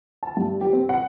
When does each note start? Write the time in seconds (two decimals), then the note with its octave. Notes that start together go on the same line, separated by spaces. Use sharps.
0.23 A5
0.37 G2
0.61 G4
0.73 C4
0.89 F#5